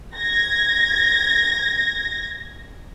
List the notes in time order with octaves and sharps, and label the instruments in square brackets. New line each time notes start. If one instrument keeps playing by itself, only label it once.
[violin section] G#6 A#6